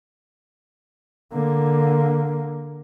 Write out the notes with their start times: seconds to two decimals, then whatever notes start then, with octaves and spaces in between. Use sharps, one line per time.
1.34 D3 A#3